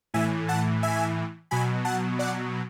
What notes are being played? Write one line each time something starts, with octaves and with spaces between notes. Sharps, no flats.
A2 E3 E5 G#5
F#5 A5
E5 G#5
B2 F#3 G#5 B5
F#5 A5
D5 F#5